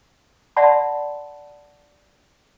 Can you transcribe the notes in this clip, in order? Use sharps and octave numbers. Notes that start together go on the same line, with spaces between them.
D5 E5 F#5 A5 B5 C6